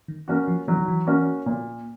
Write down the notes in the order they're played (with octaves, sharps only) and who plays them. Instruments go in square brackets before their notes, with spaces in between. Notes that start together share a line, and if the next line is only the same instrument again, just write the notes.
[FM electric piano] D#3
[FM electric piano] E3 [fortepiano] A#3 C#4 F#4
[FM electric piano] F3
[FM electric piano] E3 [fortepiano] F#3
[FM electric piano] D#3
E3
[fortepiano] A#3 C#4 F#4
A#2